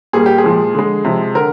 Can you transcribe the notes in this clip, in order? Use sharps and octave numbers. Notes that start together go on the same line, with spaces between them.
A#2 G3 A#3 G#4
G4
G#4
A#2 F3 G#3
D3 G#3
C3 F3 G#3
D3 A#4